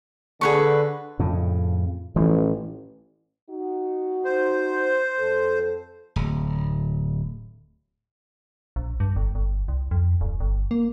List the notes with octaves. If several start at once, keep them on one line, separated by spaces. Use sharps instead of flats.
D3 G#4 B4 C#6
F2 A2 C#3
A1 E3 F3
D#4 F#4
C5
F2 A4
D1
A#1
G2
G1
G1
C2
F2
D1
G1
A#3